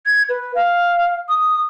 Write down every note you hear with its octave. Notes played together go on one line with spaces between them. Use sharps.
G#6
B4
F5
D#6